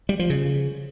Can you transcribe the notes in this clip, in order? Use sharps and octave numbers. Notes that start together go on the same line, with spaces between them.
G3
F3
C#3